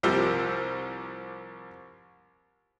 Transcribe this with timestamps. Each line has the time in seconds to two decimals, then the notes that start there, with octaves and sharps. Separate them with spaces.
0.03 C2 F3 G3 A#3 C5 E6